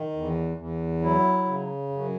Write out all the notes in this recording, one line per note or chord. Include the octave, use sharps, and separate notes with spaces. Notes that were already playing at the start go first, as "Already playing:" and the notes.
Already playing: D#3
E2
E2
F#3 E4
C#3
F#2